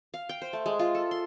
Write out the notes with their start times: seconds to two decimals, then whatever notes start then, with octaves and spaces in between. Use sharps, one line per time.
0.14 F5
0.29 G5
0.42 C5
0.53 A3
0.66 G#3
0.79 F4
0.95 A4
1.11 C6